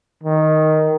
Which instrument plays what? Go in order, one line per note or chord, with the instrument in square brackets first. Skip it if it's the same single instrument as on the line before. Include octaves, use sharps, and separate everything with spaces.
[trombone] D#3